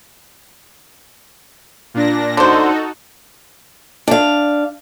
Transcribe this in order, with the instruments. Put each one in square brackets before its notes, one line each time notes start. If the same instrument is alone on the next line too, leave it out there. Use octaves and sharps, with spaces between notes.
[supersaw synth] A#2 D4 A#6
[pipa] D3 C5 [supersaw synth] D#4 F#4 A4
[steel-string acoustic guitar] D4 F5